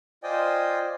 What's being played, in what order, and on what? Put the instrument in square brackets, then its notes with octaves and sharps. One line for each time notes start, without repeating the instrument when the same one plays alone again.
[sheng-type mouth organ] F4 C5 D5 D#5 G5 G#5